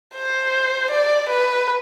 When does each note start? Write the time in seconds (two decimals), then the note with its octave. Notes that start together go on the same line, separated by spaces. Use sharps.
0.15 C5
0.91 D5
1.30 B4